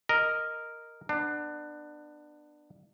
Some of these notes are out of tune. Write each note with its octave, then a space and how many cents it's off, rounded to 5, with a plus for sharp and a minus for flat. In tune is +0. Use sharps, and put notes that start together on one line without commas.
A#4 -5 D#5 +0
B3 +0 D4 +25